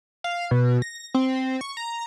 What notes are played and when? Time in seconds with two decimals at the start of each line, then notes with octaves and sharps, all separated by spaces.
0.24 F5
0.51 B2
0.82 A#6
1.14 C4
1.61 C#6
1.77 A#5